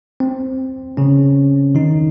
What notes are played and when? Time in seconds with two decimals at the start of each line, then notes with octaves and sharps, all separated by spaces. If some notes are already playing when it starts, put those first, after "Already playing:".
0.20 C4
0.97 C#3 C#4
1.75 D#3 D#4